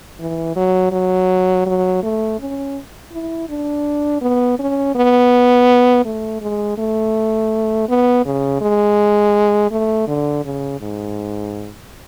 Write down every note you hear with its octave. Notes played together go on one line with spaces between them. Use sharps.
E3
F#3
F#3
F#3
A3
C#4
E4
D4
B3
C#4
B3
A3
G#3
A3
B3
C#3
G#3
A3
D3
C#3
G#2